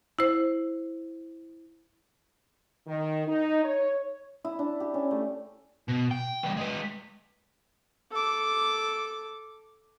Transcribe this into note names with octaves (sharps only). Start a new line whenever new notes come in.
E4 C5
D#3
D#4
C#5
E4
D4
G4
C#4
A3
B2
G5
E3 G3
G#3 B4
A4 D6